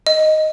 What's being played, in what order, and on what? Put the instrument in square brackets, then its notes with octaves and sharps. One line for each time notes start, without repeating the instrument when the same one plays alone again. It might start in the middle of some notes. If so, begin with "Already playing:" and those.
[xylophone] D#5